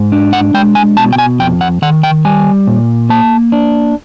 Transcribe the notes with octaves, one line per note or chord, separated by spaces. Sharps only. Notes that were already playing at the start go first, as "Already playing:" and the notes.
Already playing: G#2
D4
F#5
G#3 G5
G#5
B2 A5
G5
G#5
F2 G5
F#5
D#3 F#5
G5
G3 G#5
A#2
A#3 A5
D4